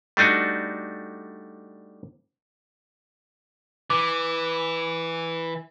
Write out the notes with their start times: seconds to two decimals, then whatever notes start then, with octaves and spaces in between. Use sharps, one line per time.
0.17 G3 A3 D4 D#4 F#4
3.90 E3 D6